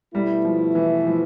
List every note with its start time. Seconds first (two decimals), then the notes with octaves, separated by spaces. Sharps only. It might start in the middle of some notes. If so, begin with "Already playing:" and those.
0.14 B2 G3 A3 E4
0.45 F3
0.75 E3
1.07 F3